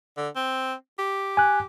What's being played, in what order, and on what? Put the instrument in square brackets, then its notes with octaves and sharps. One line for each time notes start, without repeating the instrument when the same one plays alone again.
[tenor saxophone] D3
C4
G4
[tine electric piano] G#5 F#6